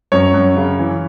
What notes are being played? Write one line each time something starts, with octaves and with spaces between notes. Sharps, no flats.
F#2 C#5
F#2
C#3
E3